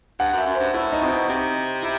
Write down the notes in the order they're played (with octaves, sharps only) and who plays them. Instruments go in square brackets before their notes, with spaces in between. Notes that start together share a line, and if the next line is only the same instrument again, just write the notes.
[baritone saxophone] G2 [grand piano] F#5
[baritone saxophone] F#2
[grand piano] E5
[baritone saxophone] F#2
[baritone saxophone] G2 [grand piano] C5
[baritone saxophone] A2 [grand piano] E4
[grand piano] D#4
[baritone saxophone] B2 [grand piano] C4
[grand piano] D#4
[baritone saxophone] C3 [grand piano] D#4
[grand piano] E4